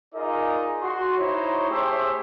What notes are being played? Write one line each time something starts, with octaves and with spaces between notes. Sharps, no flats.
D#4 F4 G#4 A#4 D5 D#5
F#4 C6
D#4 E4 C5 C#5
A3 C#4 G4 G#4 C5 E5